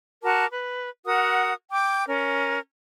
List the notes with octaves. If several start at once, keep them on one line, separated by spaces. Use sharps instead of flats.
F#4 A#4 A5 D6
B4
F#4 A#4 F#5 D#6
G5 D6 G6
C#4 A#4